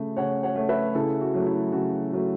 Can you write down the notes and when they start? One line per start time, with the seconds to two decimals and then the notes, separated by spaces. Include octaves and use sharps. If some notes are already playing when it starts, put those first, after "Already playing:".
Already playing: C#3 A3
0.16 C#3 C#5 F#5
0.43 C#5 F#5
0.55 A3
0.69 B4 E5
0.95 C#3 E4 A4
1.20 F#4
1.34 F#3 A3
1.46 E4
1.72 C#3 F#4
2.12 F#3 A3